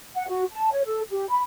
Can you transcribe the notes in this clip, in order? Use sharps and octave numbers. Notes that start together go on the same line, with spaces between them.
F#5
F#4
A5
C#5
A4
G4
B5